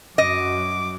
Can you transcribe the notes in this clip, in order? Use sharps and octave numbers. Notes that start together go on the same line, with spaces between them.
F#2 F#3 D#5 D6